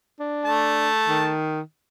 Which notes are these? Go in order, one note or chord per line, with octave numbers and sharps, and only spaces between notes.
D4
A3 A5
D#3